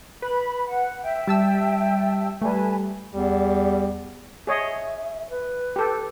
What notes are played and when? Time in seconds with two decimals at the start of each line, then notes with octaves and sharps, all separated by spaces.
0.22 B4 B5
0.68 F#5
1.03 E5 G5
1.27 G3 A5 E6
2.42 G3 A3 B4 G#5 A5
3.14 E2 G3
4.47 G#4 C#5 D#5 E5
5.30 B4
5.76 G4 A4